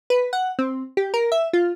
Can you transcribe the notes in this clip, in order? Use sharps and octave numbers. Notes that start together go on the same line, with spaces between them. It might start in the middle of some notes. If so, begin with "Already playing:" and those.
B4
F#5
C4
G4
A#4
E5
F4